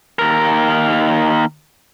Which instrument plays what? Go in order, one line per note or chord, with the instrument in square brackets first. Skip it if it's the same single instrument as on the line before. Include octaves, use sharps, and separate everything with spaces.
[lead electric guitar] D#2 A#4